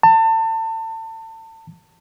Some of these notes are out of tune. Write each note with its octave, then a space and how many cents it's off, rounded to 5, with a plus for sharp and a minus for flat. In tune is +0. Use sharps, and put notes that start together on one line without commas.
A5 +30